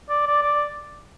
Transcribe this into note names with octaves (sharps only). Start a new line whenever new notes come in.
D5
D5
D5